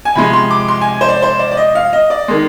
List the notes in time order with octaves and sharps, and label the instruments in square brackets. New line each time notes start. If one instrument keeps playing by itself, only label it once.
[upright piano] G#5
C3 F3 G#3 B5
C6
D6
C6
G#5
C5
D5
C5
D5
D5
D#5
F5
D#5
D5
D#3 G#3